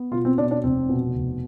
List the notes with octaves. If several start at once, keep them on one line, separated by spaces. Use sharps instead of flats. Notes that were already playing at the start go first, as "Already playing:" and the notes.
Already playing: B3
B2 F4
C4
B2 D4
D4
F1 C4
B2
F1